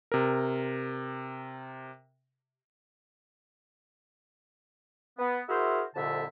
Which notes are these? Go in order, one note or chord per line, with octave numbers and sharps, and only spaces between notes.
C3 A#4
B3
E4 F#4 G#4 A#4 C5 E5
C2 F2 A#2 D3 E5 A5